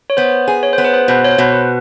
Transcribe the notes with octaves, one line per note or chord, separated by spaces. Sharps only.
C#5
B3 C5
G#4
C#5
B3 C5
B4
C5
B2 C5
C#5
C5
B2
B4